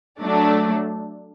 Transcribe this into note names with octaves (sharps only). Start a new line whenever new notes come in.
F#3 A3 D4